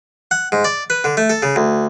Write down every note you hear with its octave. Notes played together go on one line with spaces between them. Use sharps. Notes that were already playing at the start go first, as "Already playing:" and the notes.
F#5
G#2
D5
B4
D3
A3
A4
C#3
D2